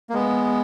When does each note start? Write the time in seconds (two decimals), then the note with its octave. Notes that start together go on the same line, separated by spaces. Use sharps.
0.10 A#3
0.14 G#3 B3